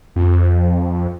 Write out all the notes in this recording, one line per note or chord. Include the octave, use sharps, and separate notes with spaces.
F2